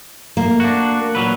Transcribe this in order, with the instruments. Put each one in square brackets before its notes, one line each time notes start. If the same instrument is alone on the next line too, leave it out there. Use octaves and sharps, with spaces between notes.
[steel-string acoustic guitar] A#3
[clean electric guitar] D4 F#4
A#2 F#3 B4